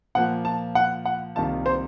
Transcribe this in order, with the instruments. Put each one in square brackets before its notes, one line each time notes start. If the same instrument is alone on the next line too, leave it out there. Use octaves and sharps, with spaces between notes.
[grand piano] A#2 F3 A#3 [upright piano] F#5
[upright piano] A5
F#5
F#5
[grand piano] C2 C3 D#3 A#3 F4 [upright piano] A5
[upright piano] C5